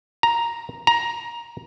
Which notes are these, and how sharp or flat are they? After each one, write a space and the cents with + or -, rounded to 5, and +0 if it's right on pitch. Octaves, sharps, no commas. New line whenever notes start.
A#5 +5
A#5 +15